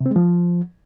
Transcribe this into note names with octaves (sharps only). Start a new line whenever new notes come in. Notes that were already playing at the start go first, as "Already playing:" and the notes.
C3
C4
G#3
F3